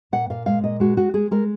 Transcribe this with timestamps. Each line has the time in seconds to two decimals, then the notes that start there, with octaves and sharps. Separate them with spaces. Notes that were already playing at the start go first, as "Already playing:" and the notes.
0.12 A#2 F#5
0.30 A#2 F5
0.46 G#3 F5
0.64 A#2 D#5
0.80 G#3 F#4
0.97 G#3 F#4
1.14 G#3 G#4
1.31 G#3 A#4